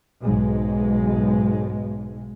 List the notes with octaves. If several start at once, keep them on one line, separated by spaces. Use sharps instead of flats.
B1 G#2 G#3